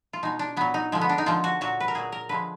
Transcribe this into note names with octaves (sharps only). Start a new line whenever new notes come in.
F4
B2 G#3 D#4
D4
A#2 F#3 B3
D#4
D3 F3 G#3
B3
D4
D#4
D3 F3 G#3 F4
F#4
A#2 F#3 F#4
B4
A#4
A#2 F#3 G#4
A#4
D3 F3 G#3 B4